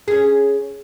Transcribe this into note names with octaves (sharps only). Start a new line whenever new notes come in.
C#4 G#4